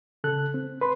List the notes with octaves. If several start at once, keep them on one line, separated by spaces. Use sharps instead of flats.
C#3 A4 F#6
C4
B4 C6